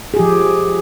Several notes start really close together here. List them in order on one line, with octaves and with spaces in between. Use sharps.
G#4 G4 F3